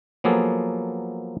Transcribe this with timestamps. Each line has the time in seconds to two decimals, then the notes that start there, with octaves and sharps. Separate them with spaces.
0.24 F3 F#3 A#3 B3 G#4 A4